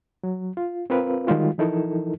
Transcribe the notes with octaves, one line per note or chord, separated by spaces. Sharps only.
F#3
F4
C4 F4 A#4 B4 F5
D#3 G3 G#3 F4 F#4
E3 F3 D#4 E4 A4 A#4